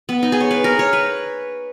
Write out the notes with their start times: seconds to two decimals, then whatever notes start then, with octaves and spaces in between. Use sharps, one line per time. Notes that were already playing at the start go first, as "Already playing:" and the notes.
0.09 B3
0.23 D#4
0.32 G#4
0.40 C#5
0.51 B4
0.64 A#4
0.79 C#5
0.93 B4